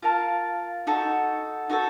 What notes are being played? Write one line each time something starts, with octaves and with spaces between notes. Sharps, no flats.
F4 A#4 F5 A5
D#4 F#4 A4
D#4 F#4 A4